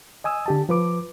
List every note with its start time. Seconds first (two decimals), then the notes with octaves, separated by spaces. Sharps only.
0.24 D#5 G#5 D#6 E6
0.46 D3 G4 A5
0.69 F3 B4 D6